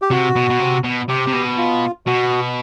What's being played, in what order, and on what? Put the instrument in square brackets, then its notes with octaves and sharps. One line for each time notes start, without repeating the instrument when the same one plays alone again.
[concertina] G4
[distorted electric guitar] C3 [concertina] F#4
[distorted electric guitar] B2
B2
C3
B2
[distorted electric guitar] C3 [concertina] G4
[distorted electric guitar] C3
B2
[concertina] F4
[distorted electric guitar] B2 [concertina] F#4